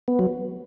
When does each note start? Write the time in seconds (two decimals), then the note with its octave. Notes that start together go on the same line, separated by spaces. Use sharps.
0.08 B3
0.19 F#3